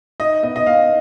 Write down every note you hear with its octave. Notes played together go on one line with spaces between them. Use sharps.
D#4 D#5
B3 D#5
D#5
B3 F5